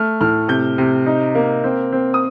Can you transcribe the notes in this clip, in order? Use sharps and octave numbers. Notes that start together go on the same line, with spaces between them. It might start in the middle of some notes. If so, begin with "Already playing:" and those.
Already playing: A3 F6
A2 F6
C3 G6
C3
D#4
A#3
C4
C4
D#6